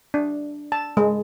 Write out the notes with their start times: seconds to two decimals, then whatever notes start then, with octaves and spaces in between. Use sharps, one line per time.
0.14 D4
0.72 A5
0.97 G#3